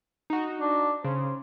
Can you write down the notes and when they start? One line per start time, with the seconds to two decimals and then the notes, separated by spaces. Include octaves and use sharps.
0.30 D#4 F#4
0.60 D4
1.04 C#3 C5